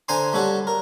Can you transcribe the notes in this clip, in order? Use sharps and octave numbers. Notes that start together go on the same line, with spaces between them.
D3 C5 G#5 A#5 C6
G3 F#4 A4 C#5
A#4